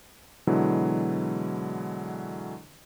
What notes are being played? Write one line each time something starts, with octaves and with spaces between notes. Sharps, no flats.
B2 D3 E3 F#3 G#3 E4